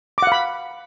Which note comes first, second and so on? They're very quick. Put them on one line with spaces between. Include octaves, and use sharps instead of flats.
D6 F#5 F5 B5